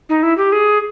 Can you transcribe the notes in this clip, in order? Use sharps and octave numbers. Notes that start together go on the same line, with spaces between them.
D#4
E4
G4
G#4